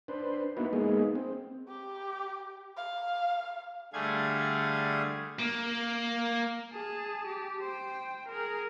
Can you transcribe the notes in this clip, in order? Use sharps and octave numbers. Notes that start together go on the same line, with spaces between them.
D4 B4 C5
A#3 B3 D#4 E4 F#4 B4
G#3 A#3 B3 D#4 G#4
C4
G4
F5
D3 G3 A3 G#4 F5 G#6
A#3
G#4 A5
G4
C5 G5
G#4 A#4